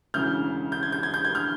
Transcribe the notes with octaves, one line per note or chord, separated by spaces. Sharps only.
E1 D2 C#3 E3 F6 G6
G6
G#6
G6
G#6
G6
G#6
F6 G6